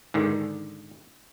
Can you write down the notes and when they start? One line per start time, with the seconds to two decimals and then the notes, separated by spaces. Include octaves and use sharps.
0.14 G#2 D3 D#3